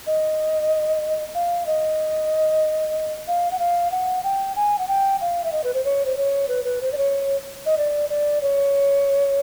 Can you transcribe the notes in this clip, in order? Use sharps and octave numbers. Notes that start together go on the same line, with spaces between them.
D#5
F5
D#5
F5
F#5
F5
F#5
G5
G#5
F#5
G5
F5
E5
D#5
B4
C5
C#5
C5
C#5
B4
B4
C5
D5
C#5
D#5
D5
D5
C#5